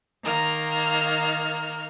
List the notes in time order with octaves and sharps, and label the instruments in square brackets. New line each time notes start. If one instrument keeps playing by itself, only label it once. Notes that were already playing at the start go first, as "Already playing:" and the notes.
[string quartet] D#3 A#3 F6